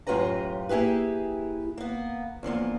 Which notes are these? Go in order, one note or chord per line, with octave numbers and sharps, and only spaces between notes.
F#2 A2 F4 G4 B4 A#5
A#3 E4 G4 G#4 B4
A#3 B3
E2 D3 F3 A#3